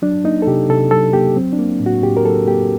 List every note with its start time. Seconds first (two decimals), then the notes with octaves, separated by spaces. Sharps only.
0.02 F#3 D4
0.24 A#3 D#4
0.42 A4
0.47 C3 G4
0.69 C3 A4
0.91 F#3 A4
1.13 A#3 G4
1.36 F#3 C4
1.52 D4
1.59 A#3
1.80 A2
1.86 F#4
2.02 A2 G4
2.17 A#4
2.25 F#3 A4
2.47 A#3 G4